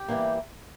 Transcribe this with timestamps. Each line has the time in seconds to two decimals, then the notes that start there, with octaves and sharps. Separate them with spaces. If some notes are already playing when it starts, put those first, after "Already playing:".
Already playing: G4
0.08 E3 G3 A#3